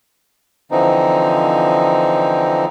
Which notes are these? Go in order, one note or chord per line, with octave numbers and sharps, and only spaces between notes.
D3 E3 F3 C4 D#4